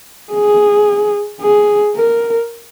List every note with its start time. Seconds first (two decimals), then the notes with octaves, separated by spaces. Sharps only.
0.32 G#4
1.41 G#4
1.96 A#4